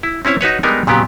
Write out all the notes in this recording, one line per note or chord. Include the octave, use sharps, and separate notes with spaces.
E4
C4 C#4 E4 C#5
D#4 F#4 B4 C#5
G3 G#3 B3 D4 D#4 A#4
A#2 C#3 F#3 B3 G4